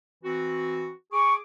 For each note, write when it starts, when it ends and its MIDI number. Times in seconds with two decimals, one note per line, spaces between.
0.24 0.91 52
0.24 0.91 60
0.24 0.91 66
1.13 1.39 68
1.13 1.34 85
1.13 1.39 86